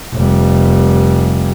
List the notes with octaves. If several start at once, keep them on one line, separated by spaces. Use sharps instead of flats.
F1 G3